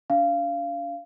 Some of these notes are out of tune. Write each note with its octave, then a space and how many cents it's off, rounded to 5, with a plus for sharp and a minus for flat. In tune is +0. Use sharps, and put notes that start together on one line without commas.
D4 -35 F5 -20